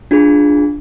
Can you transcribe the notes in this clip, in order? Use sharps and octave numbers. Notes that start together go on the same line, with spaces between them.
D4 F4 G#4